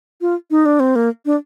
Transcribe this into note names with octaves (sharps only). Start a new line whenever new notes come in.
F4
D#4
D4
C4
A#3
D4